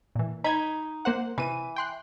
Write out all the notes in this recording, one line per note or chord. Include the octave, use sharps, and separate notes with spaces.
A#2 E3
D#4 B5 G#6
A#3 C5 F#5
C3 E3 D#7
G5 C6 F#6